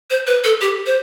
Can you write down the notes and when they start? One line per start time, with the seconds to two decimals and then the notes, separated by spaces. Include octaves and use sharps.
0.10 C5
0.27 B4
0.44 A4
0.61 G4
0.86 C5